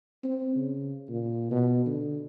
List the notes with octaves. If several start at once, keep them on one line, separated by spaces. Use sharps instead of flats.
C4
C#3
A#2
B2
D3